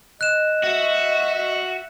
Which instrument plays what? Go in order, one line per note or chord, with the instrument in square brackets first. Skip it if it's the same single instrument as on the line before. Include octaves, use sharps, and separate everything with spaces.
[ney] D#5 [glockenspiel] F#6 E7
[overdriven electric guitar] F#4 [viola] E5